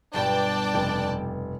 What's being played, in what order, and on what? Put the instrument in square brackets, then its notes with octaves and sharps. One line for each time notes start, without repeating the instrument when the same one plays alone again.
[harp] G1 G2 B2 [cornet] D4 [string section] D5 G5 A5
[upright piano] F1